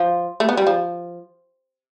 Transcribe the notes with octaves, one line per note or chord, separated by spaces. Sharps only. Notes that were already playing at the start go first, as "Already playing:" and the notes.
Already playing: F3
A3
B3
G3
F3